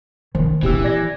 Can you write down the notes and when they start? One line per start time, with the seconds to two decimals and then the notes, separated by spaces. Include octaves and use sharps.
0.35 D#3 C5
0.63 A#2 E3 C4 E4 G4 E6
0.84 D5 G#6 A#6